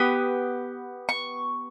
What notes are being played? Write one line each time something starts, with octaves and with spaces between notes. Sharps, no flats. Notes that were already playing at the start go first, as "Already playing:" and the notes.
Already playing: B3 G4 D#6
C#6